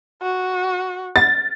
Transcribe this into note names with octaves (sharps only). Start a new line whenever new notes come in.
F#4
A6